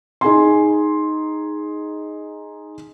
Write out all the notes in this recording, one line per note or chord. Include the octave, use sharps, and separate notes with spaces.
D#4 G#4 G#5 C6